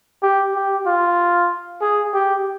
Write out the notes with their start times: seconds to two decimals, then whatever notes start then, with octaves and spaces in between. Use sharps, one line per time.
0.23 G4
0.54 G4
0.86 F4
1.81 G#4
2.13 G4